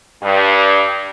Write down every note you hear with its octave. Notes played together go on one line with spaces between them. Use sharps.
G2